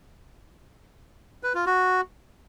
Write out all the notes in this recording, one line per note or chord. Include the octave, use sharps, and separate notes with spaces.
B4
F4
F#4